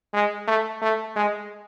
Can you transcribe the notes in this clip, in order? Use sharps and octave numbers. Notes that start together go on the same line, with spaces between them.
G#3
A3
A3
G#3